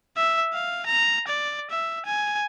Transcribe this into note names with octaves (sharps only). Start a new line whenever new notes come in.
E5
F5
A#5
D5
E5
G#5